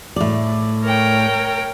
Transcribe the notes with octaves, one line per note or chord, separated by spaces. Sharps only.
A2 D5
A#4 C#5 G5